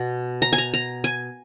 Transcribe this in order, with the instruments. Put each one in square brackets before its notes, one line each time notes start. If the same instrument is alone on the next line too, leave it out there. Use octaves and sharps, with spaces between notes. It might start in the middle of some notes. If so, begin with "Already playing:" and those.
Already playing: [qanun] B2
A#5
G#5
A#5
A#5
G#5